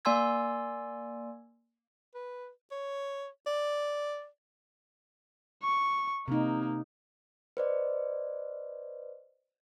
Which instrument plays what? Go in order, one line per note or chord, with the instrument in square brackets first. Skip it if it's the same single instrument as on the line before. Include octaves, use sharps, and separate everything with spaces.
[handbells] A#3 D5 G#5 C6 E6 G#6
[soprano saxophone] B4
C#5
D5
[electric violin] C#6
[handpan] C3 D#4 [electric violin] A#3
[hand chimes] B4 C5 D5 D#5